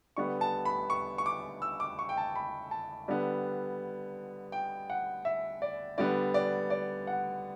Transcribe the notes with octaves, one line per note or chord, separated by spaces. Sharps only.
D3 G3 B3 C#6
A5
B5
C#6
C#6
D6
E6
D6
C#6
G5
A5
B5
A5
D3 G3 B3
G5
F#5
E5
D5
D3 G3 B3 D5
D5
D5
F#5